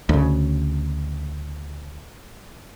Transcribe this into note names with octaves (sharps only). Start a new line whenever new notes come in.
D2 C#3